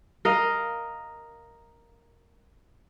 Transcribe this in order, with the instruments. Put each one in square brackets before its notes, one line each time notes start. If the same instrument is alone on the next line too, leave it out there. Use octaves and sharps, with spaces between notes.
[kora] A#4 D#5 F5